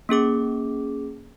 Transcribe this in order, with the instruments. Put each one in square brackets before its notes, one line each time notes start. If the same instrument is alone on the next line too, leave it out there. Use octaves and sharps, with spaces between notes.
[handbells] A#3 C#4 G#4 D6